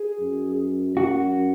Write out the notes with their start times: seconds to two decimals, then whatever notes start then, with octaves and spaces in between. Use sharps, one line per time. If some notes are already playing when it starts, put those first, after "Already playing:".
Already playing: G#4
0.20 F#2
0.96 F#2 F#4